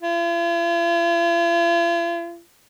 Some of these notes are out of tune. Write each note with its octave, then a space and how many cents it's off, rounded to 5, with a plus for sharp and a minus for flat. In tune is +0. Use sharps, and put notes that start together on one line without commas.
F4 -45